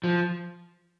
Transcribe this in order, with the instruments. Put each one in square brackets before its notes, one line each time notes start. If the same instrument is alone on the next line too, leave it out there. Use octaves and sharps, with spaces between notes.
[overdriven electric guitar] F3